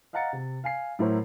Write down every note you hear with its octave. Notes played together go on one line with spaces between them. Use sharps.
D#5 F5 F#5 A#5 A6 C#7
C3
F5 G#5 C7
A2 F#3 E4 A#4 C5 C#5